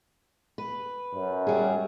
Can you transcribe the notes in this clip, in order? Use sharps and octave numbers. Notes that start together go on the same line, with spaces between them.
B4
F#2
G3 G#4